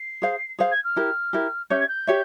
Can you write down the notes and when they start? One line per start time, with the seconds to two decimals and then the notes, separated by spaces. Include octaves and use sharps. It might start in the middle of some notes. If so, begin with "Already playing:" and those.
Already playing: C7
0.22 G#4 C5 F5
0.59 G#4 C5 F5
0.71 G#6
0.84 F6
0.96 E4 G4 A#4
1.33 E4 G4 A#4
1.70 C#4 G4 C#5 E5 G6
1.80 G#6
1.88 G6
2.07 G4 C#5 E5